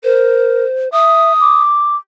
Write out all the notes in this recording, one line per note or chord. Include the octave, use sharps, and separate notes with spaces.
A#4 C5
E5 D#6
D6